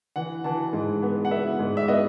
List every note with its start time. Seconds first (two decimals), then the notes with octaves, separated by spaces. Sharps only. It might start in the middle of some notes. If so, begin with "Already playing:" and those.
0.16 E3 F#5
0.44 E3 A5
0.73 G#2
1.03 B3
1.25 F#5
1.31 B3 E5
1.59 G#2
1.77 E5
1.88 B3 D#5